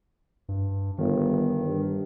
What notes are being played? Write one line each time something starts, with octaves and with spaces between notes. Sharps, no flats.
G2
G1 D#3
G2